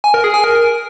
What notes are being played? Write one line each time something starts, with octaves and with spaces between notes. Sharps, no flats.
G#5
A#4
G#4
G#5
A#4